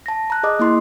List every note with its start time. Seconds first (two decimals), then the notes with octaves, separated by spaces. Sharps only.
0.06 A5 A#6
0.30 A#5 F#6
0.43 G#4 D#5 D6 D#6
0.59 A#3 E4 C6